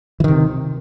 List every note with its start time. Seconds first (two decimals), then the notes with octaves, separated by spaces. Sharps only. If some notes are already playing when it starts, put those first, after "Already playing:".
0.20 E3
0.24 D#3
0.28 C3